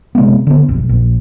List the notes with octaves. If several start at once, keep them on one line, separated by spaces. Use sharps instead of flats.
C3 G#3 A#3 B3
D3 B3
F1 B1
A#1